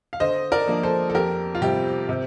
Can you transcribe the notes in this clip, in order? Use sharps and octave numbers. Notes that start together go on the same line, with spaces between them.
F5
D3 C5 D#5
A#4 D5
F3 A#3 D4
A4 C5
A4
F2 G4 A#4
F4
C3 G3 G4
C3